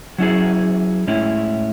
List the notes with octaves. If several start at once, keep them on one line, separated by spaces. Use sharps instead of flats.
F#3 C#4 E4 G#4
A2 G#3 C#4 E4